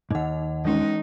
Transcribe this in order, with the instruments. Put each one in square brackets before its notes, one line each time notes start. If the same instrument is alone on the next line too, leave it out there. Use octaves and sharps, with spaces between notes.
[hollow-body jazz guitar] D#2 G#2 [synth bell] D#4 F#5
[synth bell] E3 G#3 C#4 [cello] D#4